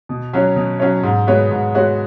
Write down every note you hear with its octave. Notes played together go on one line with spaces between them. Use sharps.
B2
F#3 C#4 F#4 C#5
B2
F#3 C#4 F#4 C#5
G#2
G#3 B3 F#4 C#5
G#2
G#3 B3 F#4 C#5